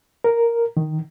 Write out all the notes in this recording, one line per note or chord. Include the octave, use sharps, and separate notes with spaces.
A#4
D#3